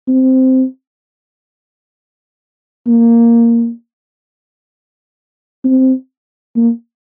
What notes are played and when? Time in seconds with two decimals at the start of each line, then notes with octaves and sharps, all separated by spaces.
0.08 C4
2.87 A#3
5.64 C4
6.56 A#3